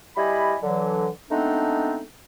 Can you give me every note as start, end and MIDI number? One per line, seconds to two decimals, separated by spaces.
0.17 0.55 55
0.17 0.55 64
0.17 0.55 75
0.17 0.55 80
0.17 0.55 83
0.63 1.08 50
0.63 1.08 52
0.63 1.08 54
1.31 2.02 56
1.31 2.02 57
1.31 2.02 59
1.31 2.02 60
1.31 2.02 62
1.31 2.02 63